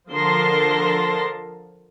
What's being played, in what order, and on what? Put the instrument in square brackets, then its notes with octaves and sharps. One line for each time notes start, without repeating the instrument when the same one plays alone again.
[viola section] D3 F3 A#4 A5 C6